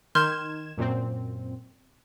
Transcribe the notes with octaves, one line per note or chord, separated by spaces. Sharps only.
D#3 C6 F6 G6 G#6 E7
F#2 A#2 C4